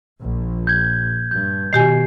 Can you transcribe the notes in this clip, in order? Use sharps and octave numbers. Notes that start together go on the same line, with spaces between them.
A#1
G6 G#6
G2 G6
B2 D#3 G4 G#5 C7